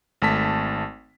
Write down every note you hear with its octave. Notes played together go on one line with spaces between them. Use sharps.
G#1 A3 A5 B6